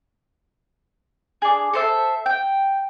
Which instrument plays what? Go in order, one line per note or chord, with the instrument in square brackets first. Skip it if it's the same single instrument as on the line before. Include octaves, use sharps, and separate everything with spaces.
[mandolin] D4 G#4
A4 C5 E5
G5